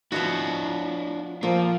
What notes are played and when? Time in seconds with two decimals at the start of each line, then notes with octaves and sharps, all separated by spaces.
0.12 F3 B3 D4 E4 F#4
1.43 A#2 F3 A#3